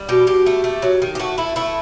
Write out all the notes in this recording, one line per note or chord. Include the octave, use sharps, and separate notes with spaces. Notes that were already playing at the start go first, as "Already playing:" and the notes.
Already playing: G3
B2 G4
B2 G4
A3
A3
F#3
D#3
G4
A3 F#4
A3 E4
A3 E4